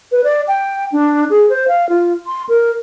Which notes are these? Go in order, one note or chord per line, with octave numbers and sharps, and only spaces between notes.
B4
D5
G5
D4
G#4
C5
F5
F4
C6
A#4